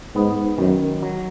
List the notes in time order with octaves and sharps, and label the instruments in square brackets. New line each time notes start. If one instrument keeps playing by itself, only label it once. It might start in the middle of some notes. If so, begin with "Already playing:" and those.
[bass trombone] G#2 [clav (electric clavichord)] B3
[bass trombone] F#2 [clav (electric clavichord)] D#3
[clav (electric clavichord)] F#3